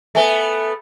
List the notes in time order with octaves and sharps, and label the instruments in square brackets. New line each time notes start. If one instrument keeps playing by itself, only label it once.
[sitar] A3 B3 [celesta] E5 G#5 G7